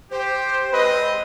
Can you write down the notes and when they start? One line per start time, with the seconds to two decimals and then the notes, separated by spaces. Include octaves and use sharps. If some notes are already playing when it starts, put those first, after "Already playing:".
0.11 G4 C5
0.72 G#3 C4 B4 D#5